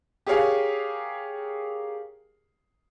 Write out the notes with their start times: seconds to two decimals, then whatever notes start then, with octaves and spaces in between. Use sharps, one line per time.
0.26 G4 G#4 A#4 C#5 F5 G#5